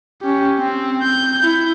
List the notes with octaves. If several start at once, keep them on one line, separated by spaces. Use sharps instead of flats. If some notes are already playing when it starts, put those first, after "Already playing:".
C#4 G4
C4
G6
E4 G6